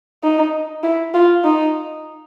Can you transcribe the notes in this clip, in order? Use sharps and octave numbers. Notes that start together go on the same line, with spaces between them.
D#4
E4
F4
D#4